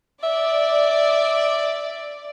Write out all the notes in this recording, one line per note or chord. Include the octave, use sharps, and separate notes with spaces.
D5 E5